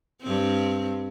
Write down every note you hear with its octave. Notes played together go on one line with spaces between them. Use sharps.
G2 C4